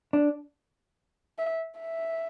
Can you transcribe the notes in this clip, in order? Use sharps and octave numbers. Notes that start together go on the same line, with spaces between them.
D4
E5
E5